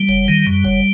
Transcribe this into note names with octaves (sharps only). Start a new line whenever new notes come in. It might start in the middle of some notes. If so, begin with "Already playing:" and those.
Already playing: G3
F#1
D#3
F#2
F#1